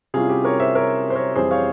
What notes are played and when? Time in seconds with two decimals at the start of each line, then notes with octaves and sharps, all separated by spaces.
0.14 C3 G3 C#4 E4 F4 G#4
0.29 G4
0.44 A#4 C#5
0.60 C5 E5
0.75 A#4 C#5
1.10 C5
1.15 A#4 C#5
1.35 F2 E3 G3 C4 G#4 C5
1.51 C#5 F5